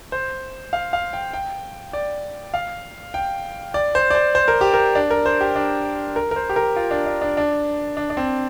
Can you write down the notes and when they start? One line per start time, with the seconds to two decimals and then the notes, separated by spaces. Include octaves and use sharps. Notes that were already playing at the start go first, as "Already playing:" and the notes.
0.12 C5
0.73 F5
0.93 F5
1.13 G5
1.33 G5
1.93 D5
2.54 F5
3.14 G5
3.74 D5
3.95 C5
4.10 D5
4.15 C5
4.35 C5
4.48 A#4
4.61 G4
4.74 A#4
4.95 D4
5.11 A#4
5.26 C5
5.41 G4
5.56 D4
6.16 A#4
6.31 A#4
6.36 C5
6.49 G4
6.56 A#4
6.76 F4
6.91 D4
7.06 D4
7.21 D4
7.37 D4
7.97 D4
8.10 D4
8.17 C4